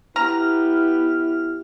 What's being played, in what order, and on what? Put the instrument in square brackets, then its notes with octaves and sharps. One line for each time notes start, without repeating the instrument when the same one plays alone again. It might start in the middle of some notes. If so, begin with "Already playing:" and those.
[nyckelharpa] B3 G4 [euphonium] E4 [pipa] A#5 [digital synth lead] F6